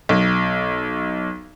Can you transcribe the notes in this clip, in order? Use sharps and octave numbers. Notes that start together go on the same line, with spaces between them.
B1